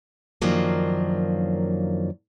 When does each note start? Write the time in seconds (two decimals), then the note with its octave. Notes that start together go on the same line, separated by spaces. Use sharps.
0.41 F#2 D#3 F3 F#3 A#3 D4